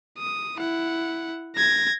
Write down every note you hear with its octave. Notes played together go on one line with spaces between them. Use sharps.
D#6
E4 F#5
G#6 A#6